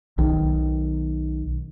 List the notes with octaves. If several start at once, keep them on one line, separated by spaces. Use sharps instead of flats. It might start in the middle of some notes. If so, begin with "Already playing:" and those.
B1 D#3